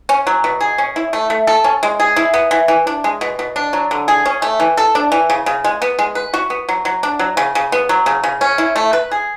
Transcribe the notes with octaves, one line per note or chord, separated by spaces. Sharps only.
C#4
F#3
B2
G#4
C#4
E4
A3
A3
A4
C#4
G#3
G#4
E4
B3
E3
E3
D4
G#3
B2
B2
D4
F#3
D3
G#4
C#4
A3
E3
A4
D4
E3
C#3
C#3
G#3
B3
G#3
B4
F#4
B3
F#3
F#3
D4
F#3
C#3
C#3
B3
F#3
C#3
C#3
C#4
E4
A3
B4
G#4